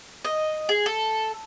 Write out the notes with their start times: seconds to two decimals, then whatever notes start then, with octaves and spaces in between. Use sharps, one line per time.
0.25 D#5
0.69 G#4
0.86 A4